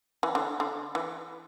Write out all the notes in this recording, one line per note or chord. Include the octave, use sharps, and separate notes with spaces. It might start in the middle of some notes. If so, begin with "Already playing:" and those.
E3
D3
D3
E3